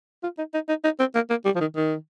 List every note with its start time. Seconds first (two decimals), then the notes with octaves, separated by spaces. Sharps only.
0.23 F4
0.38 D#4
0.54 D#4
0.69 D#4
0.84 D#4
1.00 C4
1.15 A#3
1.30 A#3
1.45 G3
1.56 F3
1.61 D#3
1.76 D#3